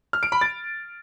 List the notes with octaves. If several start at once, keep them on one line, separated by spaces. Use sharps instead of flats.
F6
D7
B5
A6